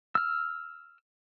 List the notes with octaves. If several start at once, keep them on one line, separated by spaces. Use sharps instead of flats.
E6 F6